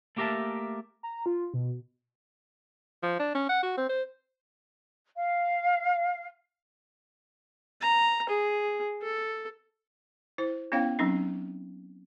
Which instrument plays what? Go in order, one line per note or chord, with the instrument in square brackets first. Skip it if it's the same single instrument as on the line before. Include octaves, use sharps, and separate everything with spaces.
[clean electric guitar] A3 A#3 G4 A#4 E5 A5
[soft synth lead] A#5
F4
B2
[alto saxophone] F3
D4
C#4
F#5
F#4
C4
C5
[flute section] F5
[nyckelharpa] A#5
G#4
A4
[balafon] E4 C5
B3 C#4 E4 C#5 F5 G5
F#3 C4 C#4 D#4